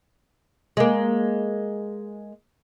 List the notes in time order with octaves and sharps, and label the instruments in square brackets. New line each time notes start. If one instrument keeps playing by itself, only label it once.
[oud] G#3 A#3